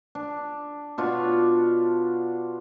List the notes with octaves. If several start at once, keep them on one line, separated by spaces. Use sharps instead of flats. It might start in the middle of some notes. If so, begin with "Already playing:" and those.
D4
B2 D4 F4 C#5